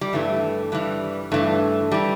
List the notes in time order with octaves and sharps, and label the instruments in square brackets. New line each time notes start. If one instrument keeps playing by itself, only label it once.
[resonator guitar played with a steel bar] G3
G2 E3 A3
G2 E3 G3
G2 E3 A3
E3 G3